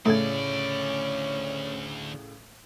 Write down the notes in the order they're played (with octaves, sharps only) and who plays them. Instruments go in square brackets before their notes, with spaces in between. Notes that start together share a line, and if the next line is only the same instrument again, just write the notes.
[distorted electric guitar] D2 D5 [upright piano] A2 C#3 [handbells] A3 A4 G#6 [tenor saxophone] C#4